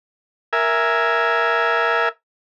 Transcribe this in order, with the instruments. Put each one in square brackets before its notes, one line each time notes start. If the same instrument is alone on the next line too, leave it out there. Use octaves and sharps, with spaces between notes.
[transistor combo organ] A#4 E5 G#5